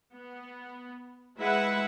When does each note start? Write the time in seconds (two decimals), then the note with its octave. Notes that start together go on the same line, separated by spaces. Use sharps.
0.13 B3
1.37 G#3 E4 B4 E5 F#5